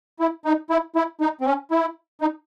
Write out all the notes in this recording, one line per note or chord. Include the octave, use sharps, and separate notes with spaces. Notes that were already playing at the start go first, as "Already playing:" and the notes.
E4
D#4
E4
E4
D#4
C4
C#4
E4
D#4